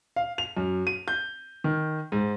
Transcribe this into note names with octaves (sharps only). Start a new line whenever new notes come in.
F5
F7
F#2
D#7
G6
D#3
G#2